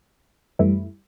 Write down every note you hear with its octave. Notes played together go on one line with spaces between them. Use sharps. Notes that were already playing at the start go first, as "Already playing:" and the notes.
F#2 E3 G3 A3 E4